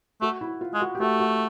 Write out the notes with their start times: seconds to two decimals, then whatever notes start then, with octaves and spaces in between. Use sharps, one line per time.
0.21 A3 F#4
0.41 E4
0.61 F4
0.74 G#3
0.81 F#4
0.95 G4
1.00 A3 F#4
1.20 F#4